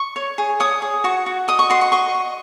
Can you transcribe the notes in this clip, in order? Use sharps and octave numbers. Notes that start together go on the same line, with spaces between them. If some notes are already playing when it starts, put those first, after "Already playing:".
Already playing: C#6
C#5
G#4
C#5 D#6
G#4
F#4 C#6
F#4
D#5 D#6
C#6
F#4 C6
C#6
D#5 C#6
D#5